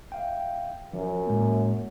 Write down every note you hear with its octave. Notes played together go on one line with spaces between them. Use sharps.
E5 F5 G5
F#2 F3
A2 G#3 A#3